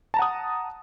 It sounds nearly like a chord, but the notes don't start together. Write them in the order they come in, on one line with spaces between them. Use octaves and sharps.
A5 A#5 F#5 D#6